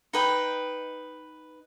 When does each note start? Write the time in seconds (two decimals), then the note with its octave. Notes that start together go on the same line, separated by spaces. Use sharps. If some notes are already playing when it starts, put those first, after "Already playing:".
0.13 D#4 B4 G5